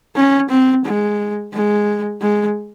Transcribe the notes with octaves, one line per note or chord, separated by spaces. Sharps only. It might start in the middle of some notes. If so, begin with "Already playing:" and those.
C#4
C4
G#3
G#3
G#3